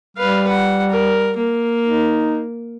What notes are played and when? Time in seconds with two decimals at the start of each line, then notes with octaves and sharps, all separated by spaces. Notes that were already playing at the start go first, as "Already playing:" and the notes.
0.17 G3 B4 F5
0.48 F#5
0.90 A#4
1.37 A#3
1.87 D#4